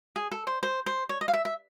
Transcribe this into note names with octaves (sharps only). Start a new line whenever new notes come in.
G#4
A4
C5
C5
C5
C#5
D#5
F5
E5
E5